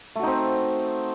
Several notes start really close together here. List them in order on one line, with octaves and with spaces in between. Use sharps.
A3 F#4 D#4 C4